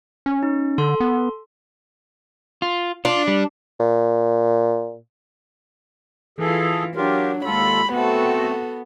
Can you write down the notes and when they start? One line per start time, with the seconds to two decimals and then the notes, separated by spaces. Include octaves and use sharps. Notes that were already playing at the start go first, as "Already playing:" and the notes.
0.26 C#4
0.43 D#4
0.78 D3 A4 C6
1.00 B3
2.62 F4
3.05 D4 F4
3.28 G3
3.80 A#2
6.39 E3 F4 G#4 A4
6.96 F#3 D4 F4 G4 A#4
7.45 D#2 G#3 F4 A4 B5
7.93 A3 B3 C4 F#4 A4